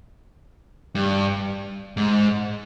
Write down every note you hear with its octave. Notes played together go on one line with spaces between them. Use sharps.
G2
G#2